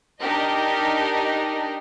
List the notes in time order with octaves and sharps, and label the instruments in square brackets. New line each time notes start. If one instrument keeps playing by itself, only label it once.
[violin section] D4 D#4 G4 A#4 D#5